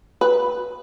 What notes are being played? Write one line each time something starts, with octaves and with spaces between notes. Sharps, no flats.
B4